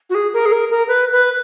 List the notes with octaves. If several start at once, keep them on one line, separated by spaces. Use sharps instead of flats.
F#4
G#4
A#4
G#4
A#4
A#4
B4
B4